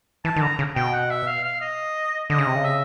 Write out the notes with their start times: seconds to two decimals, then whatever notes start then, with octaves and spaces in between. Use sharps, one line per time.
0.25 E3 A5
0.36 D#3
0.42 D3 A#5
0.59 C#3
0.75 B2 G5
0.93 F#5
1.10 E5
1.27 F5
1.44 F5
1.61 D#5
2.30 D3 D#5
2.38 C#3
2.47 C3
2.55 C#3
2.64 E5